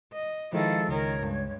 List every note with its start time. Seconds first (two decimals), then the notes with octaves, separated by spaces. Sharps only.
0.13 D#5
0.53 D#3 F3 G#3 E4 A4 F5
0.89 C#2 D#3 A#4 C#5
1.22 G2 G#3